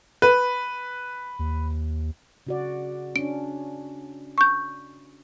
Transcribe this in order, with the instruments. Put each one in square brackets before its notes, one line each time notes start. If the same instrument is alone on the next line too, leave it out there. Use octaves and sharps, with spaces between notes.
[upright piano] B4
[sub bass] D#2
[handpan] C#3 F#4 D5
[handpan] C#4 D4 [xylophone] D7
[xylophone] C#6 G6